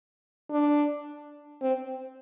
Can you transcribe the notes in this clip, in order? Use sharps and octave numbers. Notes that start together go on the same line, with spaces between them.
D4
C4